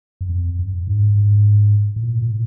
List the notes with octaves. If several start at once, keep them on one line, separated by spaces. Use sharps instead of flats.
F#2
F2
F#2
G#2
G#2
A2
A#2
A#2
A2